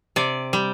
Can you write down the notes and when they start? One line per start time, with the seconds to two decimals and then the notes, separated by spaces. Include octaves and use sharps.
0.16 C3 D5
0.53 G3